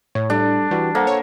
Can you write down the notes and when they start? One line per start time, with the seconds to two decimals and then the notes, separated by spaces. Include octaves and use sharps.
0.15 A2 C#5
0.30 G3 D4 A4
0.71 E3 G3 F#4
0.95 A#3 A4 C5 F#5
1.07 C#5